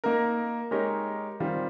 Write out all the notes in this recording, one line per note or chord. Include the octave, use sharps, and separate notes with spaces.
A#3 D#4 A#4
G#3 D#4 G4 A#4 C#5
D#3 G3 C4 F4